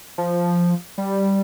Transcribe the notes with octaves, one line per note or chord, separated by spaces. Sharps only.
F3
G3